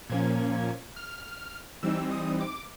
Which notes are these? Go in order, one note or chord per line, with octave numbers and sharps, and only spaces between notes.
A#2 F3 A#3 C#4 G#6
F6
E3 G3 C4 D#4 E6
D#6
D6